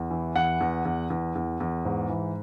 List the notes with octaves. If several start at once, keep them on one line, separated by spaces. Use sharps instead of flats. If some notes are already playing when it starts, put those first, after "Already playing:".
Already playing: E2
E3
E2 F#5
E2
E2
E2
E2
E2
G#2
E3